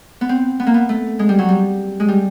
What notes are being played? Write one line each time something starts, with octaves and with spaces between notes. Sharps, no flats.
B3
C4
B3
A#3
B3
A3
G#3
G3
F#3
G3
G#3
G3